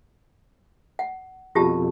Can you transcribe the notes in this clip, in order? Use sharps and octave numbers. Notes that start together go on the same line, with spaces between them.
F#5
F2 B2 F4 G4 A5